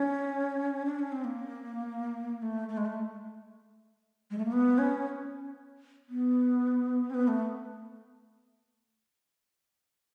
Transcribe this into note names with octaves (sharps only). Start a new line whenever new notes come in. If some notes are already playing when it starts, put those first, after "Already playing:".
Already playing: C#4
D4
C#4
C4
A#3
A3
A3
G#3
A3
G#3
A3
A#3
B3
C#4
B3
C4
B3
A3